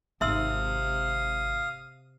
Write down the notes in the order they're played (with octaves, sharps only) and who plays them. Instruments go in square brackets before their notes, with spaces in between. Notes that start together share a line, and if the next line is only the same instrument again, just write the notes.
[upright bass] G#1 [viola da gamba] C3 [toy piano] E5 C6 E6 [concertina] F5 D#6